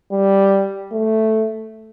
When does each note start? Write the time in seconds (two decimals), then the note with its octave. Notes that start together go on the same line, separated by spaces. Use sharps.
0.12 G3
0.92 A3